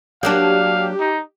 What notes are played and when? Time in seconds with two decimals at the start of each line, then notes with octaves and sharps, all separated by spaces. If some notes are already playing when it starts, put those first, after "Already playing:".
0.23 F#3 A#3 D4 G4 F5
1.00 D#4